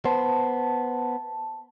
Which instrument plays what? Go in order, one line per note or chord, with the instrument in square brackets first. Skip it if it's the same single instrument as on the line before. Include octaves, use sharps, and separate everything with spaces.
[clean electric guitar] B3 C5 [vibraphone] A5